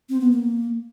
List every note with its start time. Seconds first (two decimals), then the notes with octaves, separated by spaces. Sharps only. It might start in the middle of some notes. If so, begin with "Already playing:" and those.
0.09 C4
0.20 B3
0.31 A#3